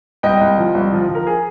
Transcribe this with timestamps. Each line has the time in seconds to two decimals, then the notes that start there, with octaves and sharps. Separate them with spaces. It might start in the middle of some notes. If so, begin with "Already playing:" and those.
0.23 C2 D#5 G5
0.41 C2
0.58 F3
0.75 C2
0.93 F3
1.09 F3
1.15 A#4
1.27 G#4